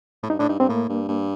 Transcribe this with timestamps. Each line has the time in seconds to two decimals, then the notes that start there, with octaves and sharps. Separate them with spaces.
0.23 A2
0.30 G2 D#4
0.39 A2 D4
0.49 G2 D#4
0.59 G2 C4
0.69 A2 A#3
0.89 G2
1.09 G2